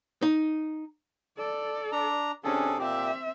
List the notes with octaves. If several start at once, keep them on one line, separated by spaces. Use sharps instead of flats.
D#4
A4 D5
D4 A#5
C3 C#4 D4 G#4 A4
A#2 C4 G4 E5